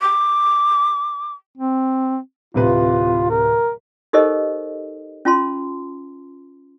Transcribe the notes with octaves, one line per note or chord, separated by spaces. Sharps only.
D6
C4
D1 C3 F4 B4
A#4
D#4 G4 A4 A#4 C5 D#5
C#4 F4 A5 C6